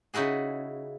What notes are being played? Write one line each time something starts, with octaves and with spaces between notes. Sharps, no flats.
C#3 D#4 E4 F#4 G#4